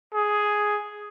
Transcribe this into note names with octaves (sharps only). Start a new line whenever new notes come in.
G#4